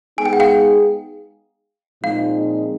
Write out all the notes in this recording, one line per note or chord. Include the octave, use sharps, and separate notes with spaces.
G#3 B3 D#4 G#4 G#5
G5
F#5
F5 G5
A#2 F3 G#3 C4 D#4 F5